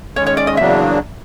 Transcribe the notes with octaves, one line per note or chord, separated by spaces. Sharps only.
D#3 G#3 C#4 C#5
C#5
D5
D#5
E2 C#3 F#3 A#3 D4 E5